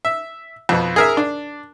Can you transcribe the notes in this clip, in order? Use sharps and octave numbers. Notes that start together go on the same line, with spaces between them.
E5
F2 B2
G#4 A#4 E5
D4